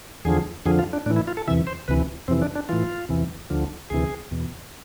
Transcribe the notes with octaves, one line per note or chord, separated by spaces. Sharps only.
E2 D3 F3 G#4
F2 D3 F3 G#4
F4
D4
A2 E3 D4
E4
F4
A4
E2 C3 E3 E5
C5
D2 C3 E3 B4
F2 C3 E3 C4
D4
D4
A2 E3 F4
E2 C3 E3
D2 D3 F3
D2 C3 E3 G#4
E2 B2